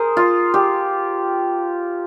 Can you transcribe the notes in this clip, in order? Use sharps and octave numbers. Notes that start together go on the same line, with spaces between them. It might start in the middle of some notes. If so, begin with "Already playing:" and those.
Already playing: G#4 A#4 C5
F4
G4